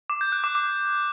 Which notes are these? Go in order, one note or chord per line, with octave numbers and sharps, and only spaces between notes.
D6
G6
F#6
D6
D6